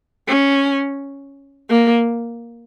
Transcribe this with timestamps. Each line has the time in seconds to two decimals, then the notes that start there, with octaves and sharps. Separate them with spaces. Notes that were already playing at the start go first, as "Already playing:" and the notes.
0.28 C#4
1.70 A#3